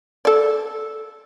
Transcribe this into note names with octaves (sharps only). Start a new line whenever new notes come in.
A4 D5